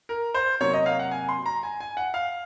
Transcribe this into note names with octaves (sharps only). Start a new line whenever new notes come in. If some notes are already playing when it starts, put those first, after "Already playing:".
A#4
C5
C3 F#3 A#3 C#5
D#5
F5
F#5
G#5
C6
A#5
G#5
G#5
F#5
F5